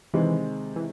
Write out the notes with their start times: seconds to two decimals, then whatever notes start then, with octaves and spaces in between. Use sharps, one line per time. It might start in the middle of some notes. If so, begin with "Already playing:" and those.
0.14 C3 D#3 E3 G#3 C4
0.76 E3